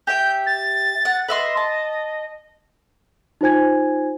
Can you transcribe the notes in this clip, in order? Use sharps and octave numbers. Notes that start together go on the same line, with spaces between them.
G4 E5 G5 G6
A6
F#5
B4 D#5 E5 C6
A5
D#4 F4 C5 G#5 G#6